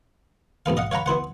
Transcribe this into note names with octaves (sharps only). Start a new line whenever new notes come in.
B1 G#2 B3 F5
D#5 F5 F#5
C#5 F5 F#5 A#5 B5
B3 E4 C5 F#5